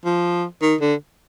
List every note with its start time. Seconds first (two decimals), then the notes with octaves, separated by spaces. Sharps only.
0.05 F3
0.62 D#3
0.81 D3